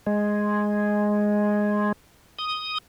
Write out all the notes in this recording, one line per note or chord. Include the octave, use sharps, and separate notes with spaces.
G#3
D#6